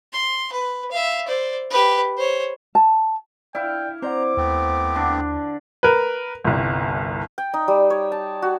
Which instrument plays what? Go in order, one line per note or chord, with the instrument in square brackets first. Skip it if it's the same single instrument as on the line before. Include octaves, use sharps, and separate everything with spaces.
[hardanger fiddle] C6
B4
E5 F5
C5 D5
G4 B4
C5 C#5
[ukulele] A5
[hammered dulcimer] E4 F5 [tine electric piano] D5 [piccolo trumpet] G5
[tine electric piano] C4 D5 F#5 [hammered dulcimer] C5 [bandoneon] A#5 [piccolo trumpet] D6
[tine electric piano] D#2 [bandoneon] A3 B3 C4
[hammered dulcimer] D3 D4
[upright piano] A#4 B4
G1 C2
[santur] G5
D#4
G3
C#5
A5
F#4